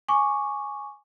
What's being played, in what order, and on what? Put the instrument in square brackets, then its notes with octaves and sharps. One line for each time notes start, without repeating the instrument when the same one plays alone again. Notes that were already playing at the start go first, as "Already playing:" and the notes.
[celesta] G#5 C#6 D6